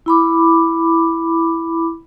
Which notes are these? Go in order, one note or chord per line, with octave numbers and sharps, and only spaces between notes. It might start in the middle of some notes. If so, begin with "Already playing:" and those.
E4 B5 D6